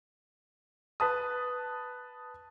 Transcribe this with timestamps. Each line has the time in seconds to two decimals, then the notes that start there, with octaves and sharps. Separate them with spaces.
1.00 B4 A5 D#6